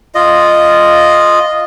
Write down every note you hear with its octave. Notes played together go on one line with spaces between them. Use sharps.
F4 D#5